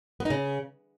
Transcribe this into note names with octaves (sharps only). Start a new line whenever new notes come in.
B3
D#4
C#3